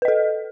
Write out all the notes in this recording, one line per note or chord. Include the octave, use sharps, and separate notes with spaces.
A4 B4 D#5